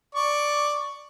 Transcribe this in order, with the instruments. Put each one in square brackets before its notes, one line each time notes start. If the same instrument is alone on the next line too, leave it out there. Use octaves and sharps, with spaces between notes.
[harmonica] D5 C#6